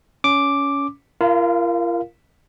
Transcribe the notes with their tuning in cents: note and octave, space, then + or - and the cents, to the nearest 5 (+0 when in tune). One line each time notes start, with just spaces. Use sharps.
C#4 +20 D6 +0
F4 -40 A#4 +0 F5 +0